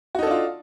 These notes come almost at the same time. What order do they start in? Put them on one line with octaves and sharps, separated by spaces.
F#4 D#4 A4 D4 F4